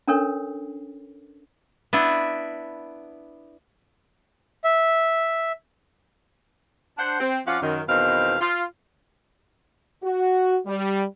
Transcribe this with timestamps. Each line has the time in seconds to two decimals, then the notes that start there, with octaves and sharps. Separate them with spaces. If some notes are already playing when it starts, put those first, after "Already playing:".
0.08 C#4 D4 A4 A#4 C#5
1.93 B3 D4 E4
4.64 E5
6.98 D4 C5 F#5
7.20 C4
7.46 F3 C#4 F4 D5 F5 F#5
7.61 F#2 D#3
7.88 E2 B2 D#3 C4 D#4 F5
8.40 F4
10.04 F#4
10.67 G3